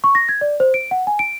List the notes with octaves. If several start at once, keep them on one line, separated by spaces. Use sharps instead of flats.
C#6
A#6
G#6
D5
C5
D7
F#5
G#5
D7